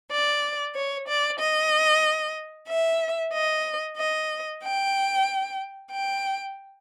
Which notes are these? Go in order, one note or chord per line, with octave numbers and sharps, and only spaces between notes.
D5
C#5
D5
D#5
E5
D#5
D#5
G5
G5